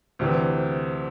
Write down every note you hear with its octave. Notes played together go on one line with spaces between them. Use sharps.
D2 C3 E3